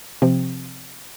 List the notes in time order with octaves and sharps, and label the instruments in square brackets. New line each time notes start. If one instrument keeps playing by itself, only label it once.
[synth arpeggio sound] C3 F3 C4